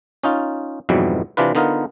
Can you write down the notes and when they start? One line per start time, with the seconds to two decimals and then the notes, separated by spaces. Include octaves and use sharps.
0.24 C#4 D#4 F4
0.89 F2 G#2 B2 E3 F#3 G3
1.37 C3 E3 D4 F4 B4
1.55 D3 B3 D#4 F4 A#4